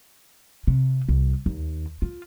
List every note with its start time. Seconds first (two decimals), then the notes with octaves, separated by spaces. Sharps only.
0.67 C3
1.09 C2
1.46 D#2
2.02 F4